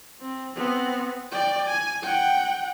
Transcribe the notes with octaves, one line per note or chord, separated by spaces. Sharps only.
C4
B3 C4
D5 G5
G#5
F#5 G5